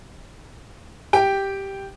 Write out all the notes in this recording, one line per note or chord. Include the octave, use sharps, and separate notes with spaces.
G4 G5